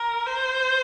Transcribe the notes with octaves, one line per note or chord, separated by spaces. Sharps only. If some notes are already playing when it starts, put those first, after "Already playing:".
Already playing: A#4
C5